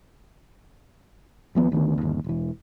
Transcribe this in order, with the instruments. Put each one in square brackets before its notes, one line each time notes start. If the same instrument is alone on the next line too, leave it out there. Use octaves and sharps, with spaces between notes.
[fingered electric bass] D#2 F3 B3
D2 D#3 B3
G1 D#2
E1 E3